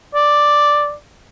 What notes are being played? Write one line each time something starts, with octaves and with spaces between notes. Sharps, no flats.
D5